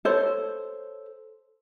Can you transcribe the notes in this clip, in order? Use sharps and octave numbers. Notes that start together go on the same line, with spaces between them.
A4 C5 C#5